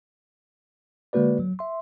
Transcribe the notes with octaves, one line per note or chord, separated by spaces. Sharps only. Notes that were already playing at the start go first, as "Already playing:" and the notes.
D3 G#3 A#3 F#4 B4 D5
F#3
E5 C6